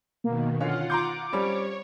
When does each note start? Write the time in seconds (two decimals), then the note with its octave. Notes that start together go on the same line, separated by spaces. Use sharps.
0.24 B2 D#3 A#3
0.61 D3 C#4 F4 F5 F#5
0.90 A#5 C6 D6 G6
1.32 G3 C4 C#4 C#5